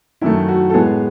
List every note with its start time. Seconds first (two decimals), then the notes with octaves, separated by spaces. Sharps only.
0.21 F#2 D#3 A3 E4
0.48 F#4
0.70 A4
0.74 A2 G#3 B3 G#4